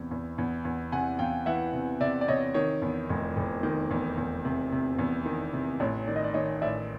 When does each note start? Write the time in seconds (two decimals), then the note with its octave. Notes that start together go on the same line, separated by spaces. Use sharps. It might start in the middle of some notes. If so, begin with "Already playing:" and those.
Already playing: E2 C3
0.11 E2
0.38 E2
0.65 E2
0.92 C3 F#5 G#5
1.19 E2 F5 G5
1.46 E3 E5 F#5
1.73 C3
2.00 C3 D5 E5
2.21 D5
2.28 C3 C#5 D#5
2.54 D#3 C#5
2.82 E2
3.09 F1
3.36 F1
3.63 D#3
3.91 E2
4.17 E2
4.45 C3
4.72 C3
4.98 E2
5.26 D#3
5.53 C3
5.80 A1 C#5
6.08 D#3 D5
6.16 D#5
6.24 D5
6.34 D#3 C#5 D#5
6.62 A1 D5 E5